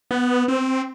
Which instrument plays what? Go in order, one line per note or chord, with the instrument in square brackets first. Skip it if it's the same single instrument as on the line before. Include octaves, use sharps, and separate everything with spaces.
[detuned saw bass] B3
C4